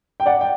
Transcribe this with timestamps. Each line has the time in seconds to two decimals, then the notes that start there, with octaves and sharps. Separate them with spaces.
0.20 G5
0.26 D5 F#5
0.41 G5